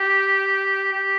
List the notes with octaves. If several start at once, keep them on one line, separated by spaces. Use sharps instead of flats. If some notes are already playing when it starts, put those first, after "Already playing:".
Already playing: G4
G4